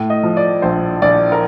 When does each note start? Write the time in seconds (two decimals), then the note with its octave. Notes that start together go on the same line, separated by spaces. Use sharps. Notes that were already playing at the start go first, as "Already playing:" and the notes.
Already playing: A2
0.10 D#5
0.23 F3
0.37 D5
0.62 A#1 C5
1.02 A#1 D5
1.32 A#4